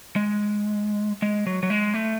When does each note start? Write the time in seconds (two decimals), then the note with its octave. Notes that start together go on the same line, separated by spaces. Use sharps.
0.16 G#3
1.22 G#3
1.47 F#3
1.63 F#3
1.70 G#3
1.94 A3